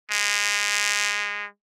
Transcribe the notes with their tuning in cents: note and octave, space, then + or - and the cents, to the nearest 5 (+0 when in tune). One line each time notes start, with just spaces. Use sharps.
G#3 -20